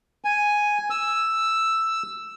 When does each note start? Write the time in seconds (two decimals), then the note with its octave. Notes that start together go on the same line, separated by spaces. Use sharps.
0.25 G#5
0.90 E6